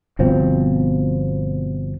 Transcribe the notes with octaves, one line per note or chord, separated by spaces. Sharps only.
G1 B2 F3 C4